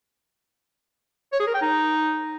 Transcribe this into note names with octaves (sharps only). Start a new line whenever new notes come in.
C#5
G#4
A#4
G5
D#4